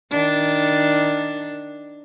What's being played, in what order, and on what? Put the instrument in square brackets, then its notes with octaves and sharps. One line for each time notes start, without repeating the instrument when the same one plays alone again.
[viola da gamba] D#3 D4